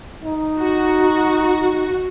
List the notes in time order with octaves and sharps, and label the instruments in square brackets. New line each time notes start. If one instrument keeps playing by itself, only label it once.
[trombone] D#4
[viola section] F#4